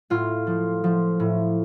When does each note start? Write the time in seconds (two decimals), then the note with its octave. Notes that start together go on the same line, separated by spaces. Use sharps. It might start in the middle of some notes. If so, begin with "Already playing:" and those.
0.10 A2 F4
0.47 F3
0.84 F3
1.20 A2